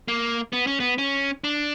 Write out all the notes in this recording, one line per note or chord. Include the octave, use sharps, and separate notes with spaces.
A#3
B3
C#4
B3
C#4
D4